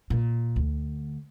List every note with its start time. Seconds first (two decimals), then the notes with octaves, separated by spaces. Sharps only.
0.10 A#2
0.56 D2